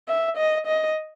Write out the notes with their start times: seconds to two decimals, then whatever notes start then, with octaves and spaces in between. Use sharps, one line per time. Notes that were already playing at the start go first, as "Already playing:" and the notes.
0.08 E5
0.37 D#5
0.67 D#5